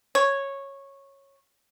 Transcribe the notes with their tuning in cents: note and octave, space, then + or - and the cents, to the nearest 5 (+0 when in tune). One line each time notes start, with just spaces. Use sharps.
C#5 -10